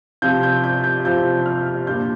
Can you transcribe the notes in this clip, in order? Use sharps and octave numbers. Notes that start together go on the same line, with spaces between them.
C3 F3 C4 F4 G6
G6
G6
G6
C3 F3 C4 F4 G6
F6
A#2 G3 D4 F4 G6